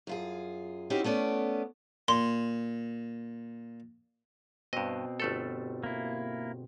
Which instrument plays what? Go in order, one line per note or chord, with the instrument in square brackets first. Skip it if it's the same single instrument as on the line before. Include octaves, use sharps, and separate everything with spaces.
[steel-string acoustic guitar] F#2 F4 G#4
C4 C#4 D#4 E4 F#4 G4
A3 B3 C#4 C5 D5
[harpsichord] A#2 [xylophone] C6
[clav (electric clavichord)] G2 D#5 [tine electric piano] B2 C4
[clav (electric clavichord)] G1 A3 A4
[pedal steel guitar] A#3 E4